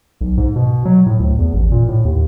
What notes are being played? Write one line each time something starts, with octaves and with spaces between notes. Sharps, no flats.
B1
G#2
B2
F#3
A2
D2
E2
A1
A#2
A2
D#2